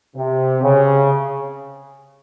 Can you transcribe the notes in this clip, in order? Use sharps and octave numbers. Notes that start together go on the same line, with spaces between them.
C3
C#3